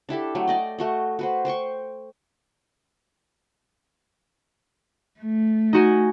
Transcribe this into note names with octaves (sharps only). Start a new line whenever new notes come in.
D4 E4 G4 A4
F#3 A3
D5 D#5 G5
A3 F#4 D#5
F#4 B4 C5
C5 G5 C6 C#6
A3
D#4 F#4 G#5